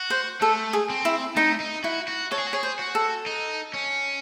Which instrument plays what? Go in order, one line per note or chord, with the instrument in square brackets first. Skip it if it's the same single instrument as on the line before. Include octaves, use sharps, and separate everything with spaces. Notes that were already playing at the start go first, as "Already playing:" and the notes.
Already playing: [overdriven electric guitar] F#4
[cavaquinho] C5
[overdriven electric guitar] A3 [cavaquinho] A4
[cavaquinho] G#4
[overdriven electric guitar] C4
[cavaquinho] E4
[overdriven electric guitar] A3 [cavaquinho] D#4
[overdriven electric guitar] D#4
[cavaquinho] E4 [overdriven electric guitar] F#4
[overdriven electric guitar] F#4
[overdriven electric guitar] A4 [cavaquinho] C#5
[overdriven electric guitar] G#4
F#4
[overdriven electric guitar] G#4 [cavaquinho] C#5
[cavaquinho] C5
[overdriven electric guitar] F#4
[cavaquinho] A4
[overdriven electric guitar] D#4
C#4